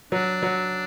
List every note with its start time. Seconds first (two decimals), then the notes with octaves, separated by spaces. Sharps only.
0.12 F#3 D4
0.43 F#3